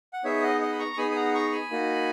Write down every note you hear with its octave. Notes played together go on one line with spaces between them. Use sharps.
F#5
B3 D#4 G#4 C#5 E5
D#5 F#5
D#5 F#5
B5
A#5 C#6
C#6
B3 D#4 G#4 G#5 B5
G#5
F#5 A#5
A#5 C#6
G#5 B5
A#3 D#4 F#4